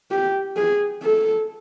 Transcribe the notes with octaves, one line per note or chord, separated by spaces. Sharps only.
G4
G#4
A4